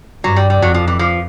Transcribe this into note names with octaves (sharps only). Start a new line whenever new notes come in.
G2 F#3
G3
G3
F2 F#3
F3
E3
F3